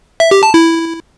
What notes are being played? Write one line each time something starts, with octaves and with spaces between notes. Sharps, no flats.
E5
G4
A5
E4